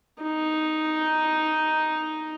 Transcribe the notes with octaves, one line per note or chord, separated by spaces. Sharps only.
D#4